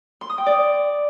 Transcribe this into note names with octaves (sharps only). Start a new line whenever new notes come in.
C6
D#6
G5
D5